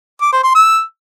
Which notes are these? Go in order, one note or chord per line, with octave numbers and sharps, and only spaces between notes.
D6
C5
C6
E6